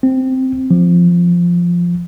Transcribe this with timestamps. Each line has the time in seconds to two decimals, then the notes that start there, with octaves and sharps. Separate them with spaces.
0.03 C4
0.71 F3